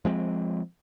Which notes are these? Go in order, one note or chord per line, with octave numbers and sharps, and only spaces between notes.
F3 G#3 C4